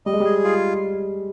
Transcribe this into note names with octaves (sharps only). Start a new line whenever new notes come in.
G3 D#5
G#3
G3 G#4
F4